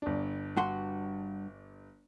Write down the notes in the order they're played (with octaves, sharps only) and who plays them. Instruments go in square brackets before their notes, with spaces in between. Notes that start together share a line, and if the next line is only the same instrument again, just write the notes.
[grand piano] G1 D4
[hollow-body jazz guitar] G2 F#4 C6